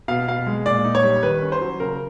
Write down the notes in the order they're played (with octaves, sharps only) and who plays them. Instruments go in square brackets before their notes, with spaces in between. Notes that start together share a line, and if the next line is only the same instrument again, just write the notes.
[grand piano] B2 F5
B2 F5
G#3
A#2 D5
D#4
C#5
G3
D#3 B4
C#4
C5
F#3
C#3 A#4